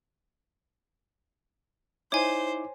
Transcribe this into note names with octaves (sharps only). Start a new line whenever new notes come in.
D#4 E4 C5 C#5 G#5 D6